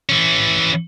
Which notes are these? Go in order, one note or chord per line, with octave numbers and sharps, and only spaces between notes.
E3 C#4